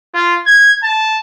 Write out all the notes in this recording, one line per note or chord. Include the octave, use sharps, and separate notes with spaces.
F4
G#6
A5